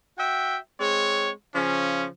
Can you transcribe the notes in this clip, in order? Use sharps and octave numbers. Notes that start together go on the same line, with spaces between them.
F#4 E5 G5
G#3 C4 C#5
C#3 F3 C#4